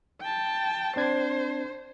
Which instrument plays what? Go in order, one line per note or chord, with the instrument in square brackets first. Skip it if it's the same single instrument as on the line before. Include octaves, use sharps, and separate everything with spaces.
[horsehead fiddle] G5 A5
[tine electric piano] C4 D4 G#6 [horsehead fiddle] C5